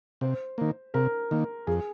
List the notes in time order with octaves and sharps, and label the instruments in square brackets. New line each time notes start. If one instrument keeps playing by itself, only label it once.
[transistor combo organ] C3 [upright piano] C5
[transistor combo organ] D#3 A#3
[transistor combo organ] C3 [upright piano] A#4
[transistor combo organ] D#3 A#3
[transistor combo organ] F2 [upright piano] G#4